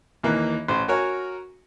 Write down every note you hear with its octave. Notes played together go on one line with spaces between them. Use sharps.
D#2 E3 A#3
A1 C5
F#4 A#4 C#5 G#5